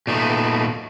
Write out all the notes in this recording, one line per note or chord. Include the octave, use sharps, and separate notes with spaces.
A#2 A3 B3 D#4